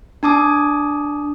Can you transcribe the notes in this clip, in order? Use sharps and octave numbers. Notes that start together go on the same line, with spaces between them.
D4 A5 D6 D#6